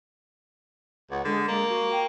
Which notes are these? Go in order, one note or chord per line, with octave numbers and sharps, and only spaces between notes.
C#2 F#5
D3 G#3
G#3 A#3
F#4
G5